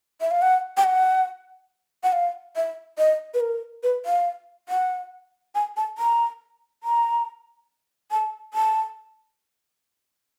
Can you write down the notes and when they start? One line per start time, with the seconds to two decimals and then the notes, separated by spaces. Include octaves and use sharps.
0.21 E5
0.31 F5
0.42 F#5
0.77 G5
0.84 F#5
2.03 F#5
2.13 F5
2.56 E5
2.98 D#5
3.34 B4
3.41 A#4
3.83 B4
4.06 F5
4.69 F#5
5.55 G#5
5.77 A5
5.98 A#5
6.84 A#5
8.11 A5
8.54 A5